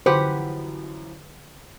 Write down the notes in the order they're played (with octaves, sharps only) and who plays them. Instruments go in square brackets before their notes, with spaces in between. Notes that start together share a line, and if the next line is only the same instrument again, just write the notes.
[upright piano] F#2 E3 F3 [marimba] D3 [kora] G4 B4 F#5 [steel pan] C5